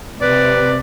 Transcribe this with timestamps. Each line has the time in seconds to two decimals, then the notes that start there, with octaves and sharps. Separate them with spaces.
0.22 C3 B4 D5